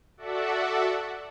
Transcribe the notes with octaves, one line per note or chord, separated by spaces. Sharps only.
F#4 A4 D5 E5 F#5